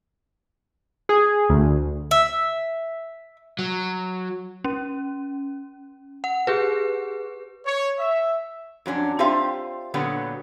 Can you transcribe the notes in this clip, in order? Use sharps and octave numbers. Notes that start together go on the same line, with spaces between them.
G#4
D2
E5
F#3
C#4
F#5
G4 G#4 B4
C#5
E5
F2 F#3 C#4 D4
C4 F4 G4 C5 E5 F5
A#2 D3 F#3 B3 F#4 G4